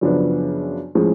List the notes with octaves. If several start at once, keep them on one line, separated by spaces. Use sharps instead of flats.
F#2 C#3 F3 B3 D4
A2 F3 G#3 C#4 G#4